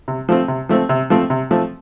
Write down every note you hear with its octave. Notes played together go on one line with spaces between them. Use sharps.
C3
F3 A3 C4
C3
F3 A3 C4
C3
F3 A3 C4
C3
F3 A3 C4